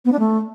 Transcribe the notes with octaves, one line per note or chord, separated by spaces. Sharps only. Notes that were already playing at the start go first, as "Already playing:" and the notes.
B3
D4
A3